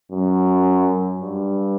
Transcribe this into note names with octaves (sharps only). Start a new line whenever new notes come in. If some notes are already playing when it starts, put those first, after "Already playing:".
F#2
G2